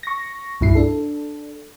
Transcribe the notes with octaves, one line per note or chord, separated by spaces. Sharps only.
C#6 A#6
C2 G2 E4 C7
D4 A4